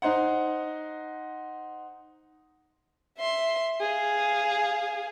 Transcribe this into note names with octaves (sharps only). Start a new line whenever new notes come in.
D#4 C5 F#5
E5 C6
G#4 F5